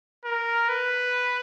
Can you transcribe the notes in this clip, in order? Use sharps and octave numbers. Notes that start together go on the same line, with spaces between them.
A#4
B4